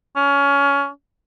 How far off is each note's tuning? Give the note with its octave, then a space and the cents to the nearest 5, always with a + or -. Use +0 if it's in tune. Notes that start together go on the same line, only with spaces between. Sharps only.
C#4 +20